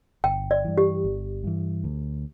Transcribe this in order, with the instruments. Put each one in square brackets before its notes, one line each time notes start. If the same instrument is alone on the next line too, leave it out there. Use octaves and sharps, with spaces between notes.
[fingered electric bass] G1 [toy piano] G5
[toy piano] D5
[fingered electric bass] G2 E3
[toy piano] G4
[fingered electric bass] G1
G2 E3
D2